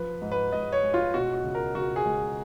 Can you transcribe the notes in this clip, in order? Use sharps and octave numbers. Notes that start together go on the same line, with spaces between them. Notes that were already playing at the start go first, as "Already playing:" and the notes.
Already playing: F3 B4
G#2
B4
G#2 D#5
C#5
G#3
F4
B2 F#4
F#4
C#2
A#4
C#2 F#4
G#4
G#3